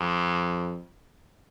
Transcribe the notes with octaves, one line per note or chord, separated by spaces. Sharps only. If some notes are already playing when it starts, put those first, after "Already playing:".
Already playing: F2